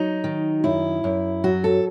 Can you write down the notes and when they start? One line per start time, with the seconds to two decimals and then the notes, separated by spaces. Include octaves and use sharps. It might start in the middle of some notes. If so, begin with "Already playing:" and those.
Already playing: F#3 D#4
0.24 D#3
0.64 F#2 E4
1.04 F#2
1.44 F#3 F#4
1.64 A4